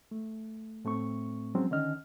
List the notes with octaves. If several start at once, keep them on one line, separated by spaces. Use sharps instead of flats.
A3
A2 A3 C4 C#6
F3 F#3 G#3 C4 C#4
D3 D#3 C#4 D#5 F6